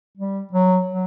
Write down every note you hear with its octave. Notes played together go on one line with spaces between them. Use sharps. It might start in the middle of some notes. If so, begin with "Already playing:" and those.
G3
F#3
F#3